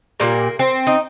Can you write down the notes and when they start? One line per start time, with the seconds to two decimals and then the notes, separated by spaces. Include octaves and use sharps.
0.20 A#2 G3 A#3
0.59 C4
0.87 D#4